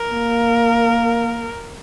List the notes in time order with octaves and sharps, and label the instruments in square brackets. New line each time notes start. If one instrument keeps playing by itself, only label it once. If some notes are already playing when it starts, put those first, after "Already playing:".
Already playing: [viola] A#4
[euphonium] A#3